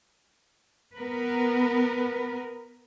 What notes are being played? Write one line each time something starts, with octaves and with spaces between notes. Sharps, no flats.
B3 A#4 B4